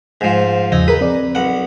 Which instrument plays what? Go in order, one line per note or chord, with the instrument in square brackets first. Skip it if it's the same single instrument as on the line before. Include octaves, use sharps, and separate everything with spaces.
[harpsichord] G#2 F3
[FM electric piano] E2 C#3 F3 [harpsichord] D#4
[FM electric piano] G#4 A#4 [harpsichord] B4
[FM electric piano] C4 D5
[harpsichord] B1 F#5